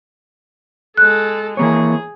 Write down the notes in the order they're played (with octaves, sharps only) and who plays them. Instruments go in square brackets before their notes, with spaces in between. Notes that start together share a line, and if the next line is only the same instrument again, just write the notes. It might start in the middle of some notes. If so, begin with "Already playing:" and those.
[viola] G#3 A4 [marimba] F#6
[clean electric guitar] E3 A#3 C#5 [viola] G#4